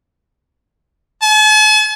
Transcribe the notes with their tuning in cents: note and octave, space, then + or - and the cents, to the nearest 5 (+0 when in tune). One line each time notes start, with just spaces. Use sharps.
A5 -45